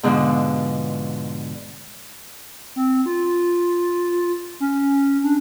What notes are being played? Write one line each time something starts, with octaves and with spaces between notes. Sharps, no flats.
G#2 B2 D3 F3
C4
F4
C#4
D4